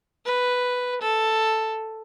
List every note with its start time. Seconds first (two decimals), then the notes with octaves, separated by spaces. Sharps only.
0.25 B4
1.00 A4